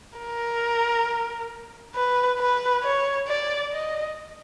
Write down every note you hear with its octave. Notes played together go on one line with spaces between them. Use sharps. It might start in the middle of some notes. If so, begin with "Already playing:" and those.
A#4
B4
B4
C#5
D5
D#5